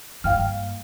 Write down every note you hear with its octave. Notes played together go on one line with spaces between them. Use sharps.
G2 A#3 F5 G5 F6